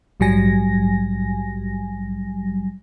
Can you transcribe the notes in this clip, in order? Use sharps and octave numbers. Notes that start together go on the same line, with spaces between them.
A#1 G#2 F#3 G3 G#5 A#6